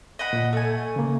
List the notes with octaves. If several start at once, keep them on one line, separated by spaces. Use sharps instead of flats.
D#5 F#5 B5
A#2
A3 G#5
C#3 A#3